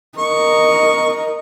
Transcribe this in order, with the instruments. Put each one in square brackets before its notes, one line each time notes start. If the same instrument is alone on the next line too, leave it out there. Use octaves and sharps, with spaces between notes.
[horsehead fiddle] A#4 D#5 [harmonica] C#6